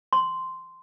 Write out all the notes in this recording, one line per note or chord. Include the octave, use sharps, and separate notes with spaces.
C6